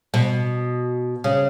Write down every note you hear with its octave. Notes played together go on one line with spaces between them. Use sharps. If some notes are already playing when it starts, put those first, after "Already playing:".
B2
C#3